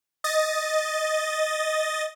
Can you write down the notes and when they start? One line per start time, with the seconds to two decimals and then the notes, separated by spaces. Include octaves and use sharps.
0.24 D#5 A6